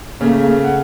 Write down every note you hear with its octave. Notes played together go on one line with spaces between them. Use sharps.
C#3 A3 A#3
F#5